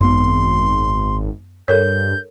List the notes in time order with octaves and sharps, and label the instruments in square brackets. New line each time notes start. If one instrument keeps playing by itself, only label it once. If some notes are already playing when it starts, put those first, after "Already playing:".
[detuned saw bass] G#1 [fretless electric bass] F#2 B3 [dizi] C6
[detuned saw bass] G2 [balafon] A4 A#4 C#5 [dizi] G6